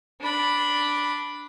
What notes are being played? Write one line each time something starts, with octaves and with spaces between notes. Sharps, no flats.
D4 B5